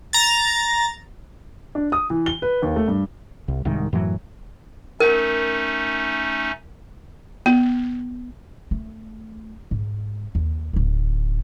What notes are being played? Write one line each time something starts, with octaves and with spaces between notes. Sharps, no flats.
A#5 A6
D4
D#6
E3
G7
B4
D#2
A3
G2
C2
C2 G#2 D#3
F#2 A2 E3 F#3
A3 C#4 D#4 A#4
B3
A3
G#2
D#2
D1 D#4